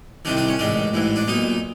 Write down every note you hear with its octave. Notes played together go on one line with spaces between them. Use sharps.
C2 C3 D#3 D4
D4
C#4
A1 G#2 D#3 D4
A1 G#2 E3
D4
B1 A#2 D#4